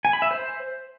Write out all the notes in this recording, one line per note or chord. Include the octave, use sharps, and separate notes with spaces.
G#5
B5
E5
C5